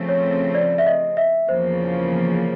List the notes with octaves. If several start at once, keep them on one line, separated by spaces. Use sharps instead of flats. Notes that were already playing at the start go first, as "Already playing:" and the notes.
Already playing: C#3 F3 A3 C4
C#5
D5
E5
D#5
E5
E2 C#3 F3 A#3 C5